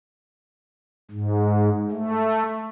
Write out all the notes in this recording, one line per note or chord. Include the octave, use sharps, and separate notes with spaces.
G#2
A3